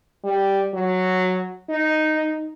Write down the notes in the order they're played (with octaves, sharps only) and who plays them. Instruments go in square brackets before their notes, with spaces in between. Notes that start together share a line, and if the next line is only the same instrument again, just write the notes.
[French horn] G3
F#3
D#4